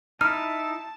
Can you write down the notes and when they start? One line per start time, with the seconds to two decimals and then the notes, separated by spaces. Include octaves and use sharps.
0.21 D#4 E4 A5 F6